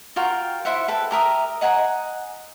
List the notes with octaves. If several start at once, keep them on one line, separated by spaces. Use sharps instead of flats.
F4 F#4 A#4 G5
E4 C5 E5 F#5
A4 B4 G5
G4 A#4 E5 D#6
D#5 F#5 G#5 A#5